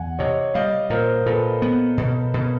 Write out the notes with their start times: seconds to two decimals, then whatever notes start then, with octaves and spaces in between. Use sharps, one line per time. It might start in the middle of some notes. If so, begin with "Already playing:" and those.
Already playing: E2 F#5 G#5
0.19 C3 C#5 D#5
0.54 G3 D#5 F5
0.90 A#2 A#4 C5
1.26 A#2 A4 B4
1.62 B3
1.98 B2
2.34 B2